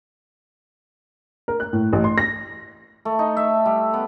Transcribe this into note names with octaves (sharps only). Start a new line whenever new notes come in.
A#4
F#6
A2
A1
C6
A#6
A3
D#4
E5
G3
B3